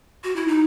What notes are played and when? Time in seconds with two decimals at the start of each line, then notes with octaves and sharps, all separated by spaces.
0.24 F#4
0.36 E4
0.48 D#4